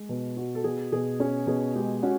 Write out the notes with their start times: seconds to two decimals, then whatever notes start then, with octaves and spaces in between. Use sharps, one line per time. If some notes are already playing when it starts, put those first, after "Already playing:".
Already playing: G#3
0.09 B2
0.37 F#4
0.55 A4
0.64 B2 G#4
0.92 B2 G#4
1.20 C#4 G#4
1.47 B2 G#4
1.75 G#3 G4
2.02 C#4 F#4